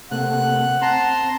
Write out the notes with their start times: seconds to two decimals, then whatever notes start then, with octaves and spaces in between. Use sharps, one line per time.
0.12 C3 A3 A#3 F#5 F#6
0.82 C4 A5 A#5 C6